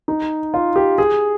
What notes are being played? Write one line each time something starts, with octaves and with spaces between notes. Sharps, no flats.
D#4
F4
G4
G#4